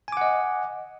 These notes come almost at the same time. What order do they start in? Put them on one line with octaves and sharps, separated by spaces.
G#5 D6 F#5 D#5